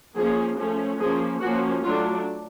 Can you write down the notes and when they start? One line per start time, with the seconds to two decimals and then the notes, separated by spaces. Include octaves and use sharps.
0.15 F3 A#3 C#4 G#4
0.57 F3 A3 C#4
1.00 F3 A#3 C#4 G#4
1.41 F3 A#3 C#4 F#4
1.83 F#3 A3 D4 F4